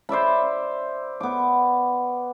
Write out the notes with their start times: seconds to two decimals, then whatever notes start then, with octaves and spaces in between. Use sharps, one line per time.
0.09 C5 D5 E5 B5
1.20 B3 D6